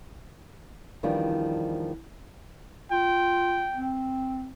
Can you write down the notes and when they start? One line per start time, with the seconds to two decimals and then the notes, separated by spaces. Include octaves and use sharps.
1.03 E2 D#3 F3 G3 D4
2.92 F4 G5
3.75 C4